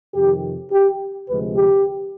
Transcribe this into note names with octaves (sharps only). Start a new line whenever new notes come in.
F2 C3 D#3 G4
G4
D2 C3 F3 G#3 B4
G4